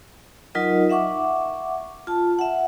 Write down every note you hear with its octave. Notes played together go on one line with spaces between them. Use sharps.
F#3 D#4 F4 A#4 D#5
E5 F#5 C#6 D6
F4 A5
E5 F#5